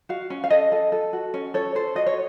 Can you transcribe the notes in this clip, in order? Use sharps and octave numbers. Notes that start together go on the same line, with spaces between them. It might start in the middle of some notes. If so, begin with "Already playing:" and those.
F#4 F5
C#4
F5
A4 D#5
A4
A4
F#4
C#4
A4 C#5
A4 C5
F#4 D#5
C#5